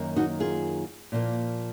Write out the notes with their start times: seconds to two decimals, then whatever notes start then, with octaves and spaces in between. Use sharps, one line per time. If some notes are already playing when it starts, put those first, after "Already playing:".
Already playing: F#2 D#3 A#3
0.16 D#4 F#4
0.40 F4 G#4
1.12 A#2 F3 A#3